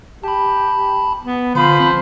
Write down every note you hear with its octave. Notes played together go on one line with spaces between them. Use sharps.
G4 A5 B5
B3
D3 F3 C5 B5
C4